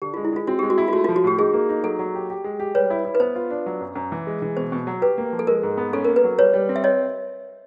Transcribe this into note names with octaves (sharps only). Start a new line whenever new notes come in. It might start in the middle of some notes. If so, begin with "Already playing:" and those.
D3 G4
F4
G#3
E4
G#3 F4
C4 F#4
G#3 G4
F#4
E4
F4
A3 F#4
F4
F3
F#4
A2 G4
D#4 G#4
A#3
D#4
F#3 A4
F#3
G4
G4
G#3
G4
G3 B4 C#5
E4
E4
B4
B3 C5
F4
D4
F#3
F#2
F#2
E3
G#3
E3
B2 C5
B2
F#3
G4 B4
A#3
F3
A4
G#3 A#4
G#2
B3
C#4 A4
A#4
A#3
B4
F#3
G3 B4 C#5
G3
C4
E5
C#5 D#5